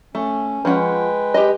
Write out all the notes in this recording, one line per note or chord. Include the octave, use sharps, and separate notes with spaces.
A3 C#4
F3 G#3 C#4 B4 F#5 G5
G4 D#5